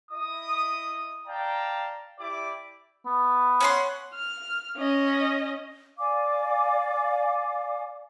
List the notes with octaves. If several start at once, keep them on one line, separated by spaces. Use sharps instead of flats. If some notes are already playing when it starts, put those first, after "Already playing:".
E4 D#5 D#6
D5 F5 G5 A5 A#5
E4 G4 D5 G5 D6
B3
C#4 F#5 C6
F6
C#4 D#5
D5 F5 G#5 D6